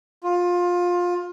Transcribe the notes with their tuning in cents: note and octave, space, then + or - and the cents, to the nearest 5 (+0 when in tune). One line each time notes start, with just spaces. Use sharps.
F4 +20